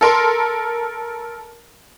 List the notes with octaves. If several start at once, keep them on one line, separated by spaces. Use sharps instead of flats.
A4 A#4 C6